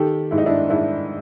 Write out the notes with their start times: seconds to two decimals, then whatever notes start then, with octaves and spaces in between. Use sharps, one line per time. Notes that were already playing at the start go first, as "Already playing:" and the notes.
Already playing: D#3 G4 A4
0.31 G#2 E4
0.38 D#4
0.46 D4 E4
0.70 G#2 D4 E4